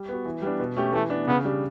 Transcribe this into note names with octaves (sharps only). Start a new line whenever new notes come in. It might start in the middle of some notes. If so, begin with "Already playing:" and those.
Already playing: G3
B3 F#4
E3
G3 B3 D4
B2
A3 C#4 G4
E3 A3
B3 D4
C#3 B3
G3 D4 G4